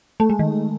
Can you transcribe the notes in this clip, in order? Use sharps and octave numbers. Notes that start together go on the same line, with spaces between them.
A3
G#3
D#3